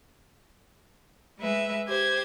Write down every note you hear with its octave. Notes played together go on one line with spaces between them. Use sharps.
G#3 B4 E5
G4 C5 G#6